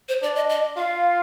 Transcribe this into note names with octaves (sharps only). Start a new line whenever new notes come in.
C5
D4 D5
D#5
D#5
F4 F5